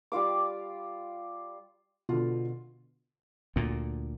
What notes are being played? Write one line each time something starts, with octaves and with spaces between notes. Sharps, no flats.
G3 F4 F5 D6
B2 D3 F4
D2 A#2